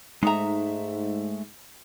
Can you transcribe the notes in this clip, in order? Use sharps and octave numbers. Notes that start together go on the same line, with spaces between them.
G#2 G#3 A3 D#4 E5 A#5